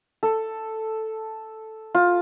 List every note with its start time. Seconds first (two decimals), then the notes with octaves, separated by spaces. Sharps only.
0.23 A4
1.95 F4